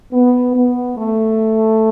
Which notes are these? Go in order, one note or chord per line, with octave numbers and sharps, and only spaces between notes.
B3
B3
A3